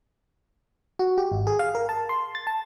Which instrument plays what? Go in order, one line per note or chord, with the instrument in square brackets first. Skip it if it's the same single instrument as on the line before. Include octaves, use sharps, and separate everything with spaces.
[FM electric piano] F#4
G4
G#1
G#4
F5
A#4
A5
C6
A6
A5